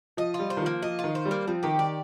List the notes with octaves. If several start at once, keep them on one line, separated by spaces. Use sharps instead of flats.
F3 D#5
F4
G3
C5
D#3
F3 A#3
F3 D#5
F4
D#3
C5
G3
A#3
F3 C4
D#3 G4
D#3 D5